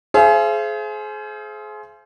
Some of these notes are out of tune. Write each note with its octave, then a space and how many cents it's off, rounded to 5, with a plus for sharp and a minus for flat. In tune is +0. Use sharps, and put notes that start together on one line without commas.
G#4 +30 C5 +0 F5 -45